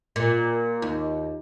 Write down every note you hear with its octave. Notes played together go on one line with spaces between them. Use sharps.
A#2
D#2